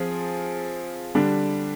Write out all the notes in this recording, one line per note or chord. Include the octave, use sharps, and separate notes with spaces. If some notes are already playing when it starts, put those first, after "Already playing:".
Already playing: F3 C4 F4 G#4
D3 G3 D4